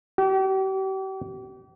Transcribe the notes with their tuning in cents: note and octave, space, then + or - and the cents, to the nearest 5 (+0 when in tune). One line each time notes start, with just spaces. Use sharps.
G4 -40